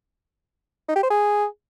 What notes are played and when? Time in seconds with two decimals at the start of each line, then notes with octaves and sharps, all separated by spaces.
0.89 D#4
0.96 G4
1.03 C5
1.10 G#4